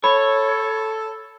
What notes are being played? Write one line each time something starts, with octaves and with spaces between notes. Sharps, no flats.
A4 C#5 B5